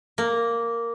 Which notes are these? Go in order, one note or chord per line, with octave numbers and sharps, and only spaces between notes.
A#3